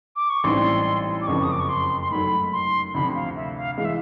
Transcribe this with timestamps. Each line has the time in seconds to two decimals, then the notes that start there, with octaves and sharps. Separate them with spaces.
0.16 D6
0.30 C#6
0.44 A1 G#2 E3 G3 C4 C6
1.22 D6
1.27 F#1 F2 C#3 F3 C#6
1.44 D#6
1.52 D6
1.60 C#6
1.69 C6
2.01 C6
2.10 G#2 D#3 F#3 A3 B5
2.52 C6
2.94 D2 C3 F3 B5
3.15 F5
3.36 E5
3.56 F5
3.77 E3 G#3 F5
3.85 E5